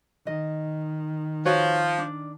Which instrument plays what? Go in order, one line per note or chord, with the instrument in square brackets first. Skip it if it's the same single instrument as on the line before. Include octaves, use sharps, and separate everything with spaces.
[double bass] D#3 [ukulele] D#5
[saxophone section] F3 [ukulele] F#4 B4 C#5
[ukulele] D4